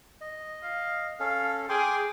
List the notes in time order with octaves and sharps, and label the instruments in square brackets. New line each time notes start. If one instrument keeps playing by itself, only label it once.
[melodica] D#5
[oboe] F5
[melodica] C#4 A4 [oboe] F5
[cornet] G#4 [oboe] G5 [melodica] C6 D6